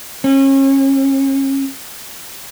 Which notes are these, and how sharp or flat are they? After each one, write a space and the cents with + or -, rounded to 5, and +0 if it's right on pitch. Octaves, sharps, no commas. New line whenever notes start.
C#4 -35